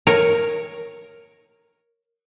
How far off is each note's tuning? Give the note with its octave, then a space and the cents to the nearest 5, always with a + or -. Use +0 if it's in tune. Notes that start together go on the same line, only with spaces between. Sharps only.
A#4 +0 C#5 +0